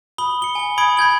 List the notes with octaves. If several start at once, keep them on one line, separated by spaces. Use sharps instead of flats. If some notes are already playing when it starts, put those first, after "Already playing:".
B5 D#6 G7
C#7 G7
G#5 G7
B5 D#6 G#6 D7
B5 G6 G#6 F#7